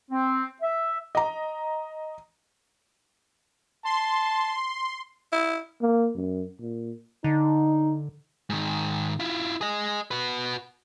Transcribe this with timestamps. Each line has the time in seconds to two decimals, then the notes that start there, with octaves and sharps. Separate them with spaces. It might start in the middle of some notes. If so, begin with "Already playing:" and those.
0.11 C4
0.62 E5
1.15 D#5 A#5
3.85 A5 C6
5.32 E4
5.82 A#3
6.15 F#2
6.60 A#2
7.24 D3 D#4
8.50 G#2 D#3
9.20 E4 F4
9.61 G#4 D#5
10.11 F#4 B4